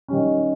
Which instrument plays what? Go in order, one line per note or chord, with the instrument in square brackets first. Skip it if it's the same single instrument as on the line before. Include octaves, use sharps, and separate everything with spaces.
[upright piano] D#3 G3 C#4